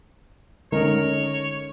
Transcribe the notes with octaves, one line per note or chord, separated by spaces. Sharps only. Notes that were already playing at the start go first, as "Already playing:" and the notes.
D3 G#3 C#4 D#4 A#4 C#5